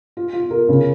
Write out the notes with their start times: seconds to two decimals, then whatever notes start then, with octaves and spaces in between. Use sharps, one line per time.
0.17 F4
0.33 F4
0.51 A#4
0.69 C#3